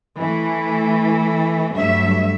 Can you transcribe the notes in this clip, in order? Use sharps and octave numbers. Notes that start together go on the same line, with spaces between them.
E3 A3
G2 F#3 A3 E5